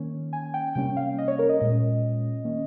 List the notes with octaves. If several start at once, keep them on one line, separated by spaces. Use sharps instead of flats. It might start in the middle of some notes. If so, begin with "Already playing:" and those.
Already playing: D#3 A#3 C#4
G#5
G5
C3 G3 A#3 C#4 G5
F5
D#5
C#5
A#4
D#5
A#2 G#3 C#4 D#5
D#3 A#3 C#4